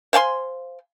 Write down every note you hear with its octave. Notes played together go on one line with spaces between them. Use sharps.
C5 F5 G#5 C6